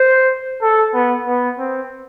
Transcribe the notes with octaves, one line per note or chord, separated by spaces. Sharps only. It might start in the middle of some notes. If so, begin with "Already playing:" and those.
Already playing: C5
A4
B3
B3
C4